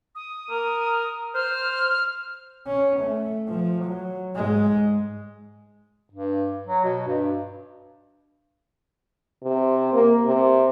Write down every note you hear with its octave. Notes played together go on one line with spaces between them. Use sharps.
D#6
A#4
C5 F6
C#4
A3
F3
F#3
G#2 G#3
G2
F#3
B2
G2
C3
A#3
C3